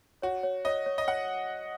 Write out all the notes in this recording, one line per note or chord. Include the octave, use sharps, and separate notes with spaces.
F#4 C#5
C#5
C#5 D#5
C#5
D#5
C#5 F#5